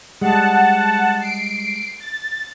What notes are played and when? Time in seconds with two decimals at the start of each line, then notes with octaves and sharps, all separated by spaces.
0.21 G3 G#3 F#5 A5
1.21 C7 D7
2.00 A6